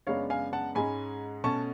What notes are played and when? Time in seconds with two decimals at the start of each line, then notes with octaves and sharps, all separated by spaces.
0.07 F#2 C#3 G#3 B3 D4 C#5 F5
0.30 F5 G#5
0.53 F#5 A5
0.75 G#2 G#3 C#4 G#5 B5
1.44 B2 A3 C#4 A5 C#6